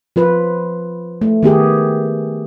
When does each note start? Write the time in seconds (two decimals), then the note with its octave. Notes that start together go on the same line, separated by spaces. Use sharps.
0.16 F3 F4 B4
1.21 A3
1.43 D#3 B3 G4 G#4